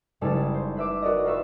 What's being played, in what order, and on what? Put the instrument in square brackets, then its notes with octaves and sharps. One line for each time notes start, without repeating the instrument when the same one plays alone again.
[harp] F#1 G3 G#3 D#4 E4 A5
C5
B4 E5 D6
F#4 A#4 D5 D#5
F4 A#4 B4 E5 C#6